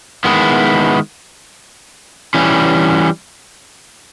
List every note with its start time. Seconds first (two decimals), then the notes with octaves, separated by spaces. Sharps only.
0.24 D#3 G#3 B3 E4
2.35 E3 G3 C#4